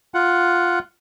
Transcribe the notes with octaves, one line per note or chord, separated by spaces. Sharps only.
F4 F#5